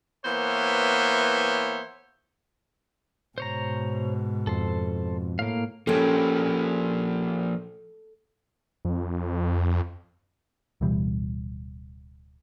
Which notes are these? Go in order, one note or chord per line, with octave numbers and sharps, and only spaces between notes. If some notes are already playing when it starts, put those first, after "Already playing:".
E3 A#3 B3 C5 C#5 E5
G#2 B2 C5 C#5 A#5
F2 A4 C5
A2 A#3 F5
F3 A#3 C#4 G4 A4
F2
D1 B2 E3 G3